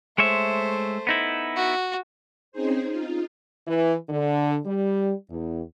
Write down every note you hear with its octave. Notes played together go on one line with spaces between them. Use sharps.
G#3 A3 C5 C#5 E5
B3 D#4 E4
F#4
C4 C#4 D#4 G#4 C5
D#4 F4
E3
D3
G3
E2